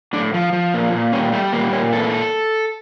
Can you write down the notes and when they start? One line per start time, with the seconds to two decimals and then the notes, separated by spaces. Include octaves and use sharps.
0.13 A2 D4
0.34 F3
0.53 F3
0.74 A#2
0.93 A#2
1.12 G3 C#4
1.32 G3 A3
1.53 A#2 A#3
1.72 A#2 C#4
1.93 E3 A4